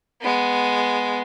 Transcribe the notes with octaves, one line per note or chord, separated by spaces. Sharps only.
G#3 B3